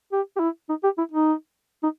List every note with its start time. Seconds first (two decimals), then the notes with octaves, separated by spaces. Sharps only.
0.12 G4
0.36 G4
0.40 E4
0.69 D#4
0.84 G4
0.98 E4
1.12 D#4
1.83 D#4